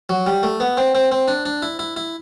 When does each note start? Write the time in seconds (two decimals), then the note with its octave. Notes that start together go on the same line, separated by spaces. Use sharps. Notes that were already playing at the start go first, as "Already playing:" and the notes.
0.09 F#3
0.26 G3
0.43 A3
0.60 B3
0.77 C4
0.95 C4
1.12 C4
1.28 D4
1.45 D4
1.62 E4
1.79 E4
1.96 E4